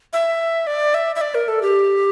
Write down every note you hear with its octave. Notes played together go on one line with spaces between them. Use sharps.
E5
D5
E5
E5
D5
A#4
A4
G4